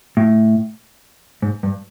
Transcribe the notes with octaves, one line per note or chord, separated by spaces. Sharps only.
A2
G#2
G2